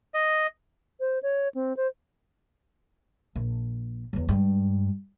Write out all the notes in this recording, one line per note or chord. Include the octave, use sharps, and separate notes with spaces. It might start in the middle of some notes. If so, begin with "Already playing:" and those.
D#5
C5
C#5
C4
C5
A#1
E2 F#3
G2 G#3